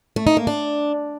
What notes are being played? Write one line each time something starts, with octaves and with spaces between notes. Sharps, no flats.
A3
D#4
A#3
D4